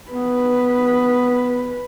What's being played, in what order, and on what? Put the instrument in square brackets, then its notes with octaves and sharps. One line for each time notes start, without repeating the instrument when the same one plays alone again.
[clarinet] B3 [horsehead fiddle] B4